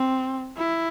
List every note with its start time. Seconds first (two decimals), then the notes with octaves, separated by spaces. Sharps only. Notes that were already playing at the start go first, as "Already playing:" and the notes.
Already playing: C4
0.58 E4